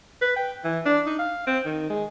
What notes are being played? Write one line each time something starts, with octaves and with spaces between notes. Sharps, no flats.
B4
G5
E3
D4
D#4
F5
C4
D#3
G#3